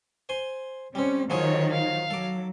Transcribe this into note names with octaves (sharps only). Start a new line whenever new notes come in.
C5 G#5 C6
G3 C4 C#4
D#3 F3 F#3 G#4 C#5
F5
F#3 A4 D6